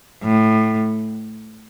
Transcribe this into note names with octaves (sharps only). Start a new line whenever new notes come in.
A2